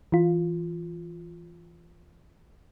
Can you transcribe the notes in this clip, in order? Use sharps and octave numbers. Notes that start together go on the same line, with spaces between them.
E3 F4